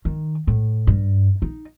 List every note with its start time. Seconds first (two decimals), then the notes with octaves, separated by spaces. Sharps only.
0.05 D#3
0.47 A2
0.87 G2
1.42 D#4